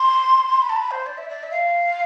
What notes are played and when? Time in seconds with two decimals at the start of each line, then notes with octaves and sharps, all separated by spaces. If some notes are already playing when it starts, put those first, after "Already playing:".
Already playing: C6
0.62 B5
0.69 A5
0.76 B5
0.91 C5
1.06 D5
1.18 E5
1.29 D5
1.43 E5
1.51 F5